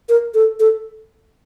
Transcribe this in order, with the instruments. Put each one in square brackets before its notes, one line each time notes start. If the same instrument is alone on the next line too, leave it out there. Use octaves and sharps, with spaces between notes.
[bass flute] A#4
A4
A4